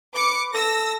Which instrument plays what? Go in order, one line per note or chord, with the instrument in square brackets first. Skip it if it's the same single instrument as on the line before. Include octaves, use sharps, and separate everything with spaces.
[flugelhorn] B4 [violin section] D6 C#7
[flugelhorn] A4 [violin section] E6 A#6